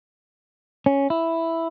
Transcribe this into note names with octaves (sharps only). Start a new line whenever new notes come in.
C#4
E4